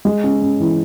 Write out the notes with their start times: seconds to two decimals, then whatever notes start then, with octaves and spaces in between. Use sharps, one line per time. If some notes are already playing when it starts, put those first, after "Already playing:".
0.05 G#3
0.24 C#4
0.42 C#4
0.60 E3